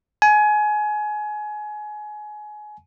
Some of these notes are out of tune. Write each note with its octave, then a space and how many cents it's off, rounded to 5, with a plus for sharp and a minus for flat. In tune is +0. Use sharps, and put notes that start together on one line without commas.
G#5 +25